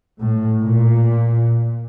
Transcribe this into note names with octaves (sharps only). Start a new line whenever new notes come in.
A2
A#2